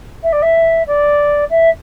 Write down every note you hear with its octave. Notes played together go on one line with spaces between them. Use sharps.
E5
D5
E5
D5
E5